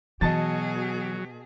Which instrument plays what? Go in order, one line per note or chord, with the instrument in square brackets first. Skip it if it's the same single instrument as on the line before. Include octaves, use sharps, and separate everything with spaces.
[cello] B2 G#4 [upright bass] E3 B3 [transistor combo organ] F#3 [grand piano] D#5 A5 A6